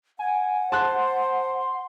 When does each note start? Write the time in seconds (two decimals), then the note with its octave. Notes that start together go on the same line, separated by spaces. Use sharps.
0.19 F#5 G#5
0.72 C5 A5 C6 F#6